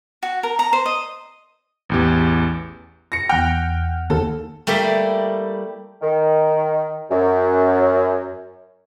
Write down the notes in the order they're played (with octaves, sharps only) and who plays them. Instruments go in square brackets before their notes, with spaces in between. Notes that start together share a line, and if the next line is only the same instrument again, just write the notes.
[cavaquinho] F#4
A#4
A#5
C5
D#5
[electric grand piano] A1 E2 G4
[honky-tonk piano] A#6 C#7
[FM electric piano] E2 F#5 F6 [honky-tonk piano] G5
[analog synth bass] D#2 [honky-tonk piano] A4
[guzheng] G3 A3 A#3 E4 G4
[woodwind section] D#3
F#2